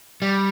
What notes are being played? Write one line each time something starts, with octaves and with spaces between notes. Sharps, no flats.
G3